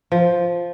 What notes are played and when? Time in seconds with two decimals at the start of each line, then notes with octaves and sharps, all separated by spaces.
0.12 F3